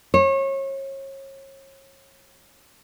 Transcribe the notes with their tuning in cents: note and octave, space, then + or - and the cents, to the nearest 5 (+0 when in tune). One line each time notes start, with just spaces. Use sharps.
C#5 -30